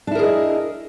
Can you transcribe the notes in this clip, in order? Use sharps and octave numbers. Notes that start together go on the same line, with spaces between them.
D4 E4 G#4 A#4 D#5